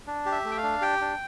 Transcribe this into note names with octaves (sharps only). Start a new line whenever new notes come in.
D4
G4
E5
A3
G5
F5
D4
G4 G5
D4